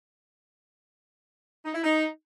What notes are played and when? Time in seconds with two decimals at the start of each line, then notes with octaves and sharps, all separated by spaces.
1.65 D#4
1.75 E4
1.84 D#4